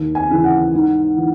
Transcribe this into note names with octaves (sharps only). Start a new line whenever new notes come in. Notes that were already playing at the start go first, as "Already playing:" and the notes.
Already playing: D#2
G#5
C#3 E3
F#5
G#2
E3